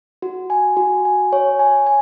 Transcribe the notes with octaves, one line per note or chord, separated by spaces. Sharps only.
F#4
G#5
F#4
G#5
C#5
G#5
G#5